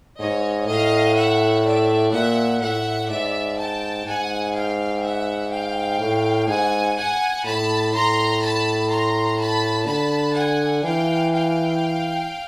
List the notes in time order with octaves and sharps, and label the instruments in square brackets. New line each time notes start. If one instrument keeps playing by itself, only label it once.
[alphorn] G#2 [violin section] C#5 D#5
[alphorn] A2 [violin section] D#5 F5
[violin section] E5 F#5
D5 E5
[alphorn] A#2 [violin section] E5 F#5
[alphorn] A2 [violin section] E5 F#5
[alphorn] G#2 [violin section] D5 E5
[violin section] G5 A5
[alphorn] G#2 [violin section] F#5 G#5
[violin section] F5 G5
E5 F#5
F5 G5
[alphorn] A2
[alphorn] G#2 [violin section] F#5 G#5
[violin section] F#5 G#5
[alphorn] A2 [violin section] A5 B5
[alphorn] A2 [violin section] A#5 C6
[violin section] A5 B5
A#5 C6
A5 B5
[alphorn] D3 [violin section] A5 B5
[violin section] F#5 G#5
[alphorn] E3 [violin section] F5 G5
[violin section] F5 G5